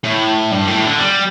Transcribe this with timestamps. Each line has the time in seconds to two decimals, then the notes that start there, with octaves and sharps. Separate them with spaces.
0.04 A2
0.51 G2
0.67 A2
0.83 D3
0.98 G3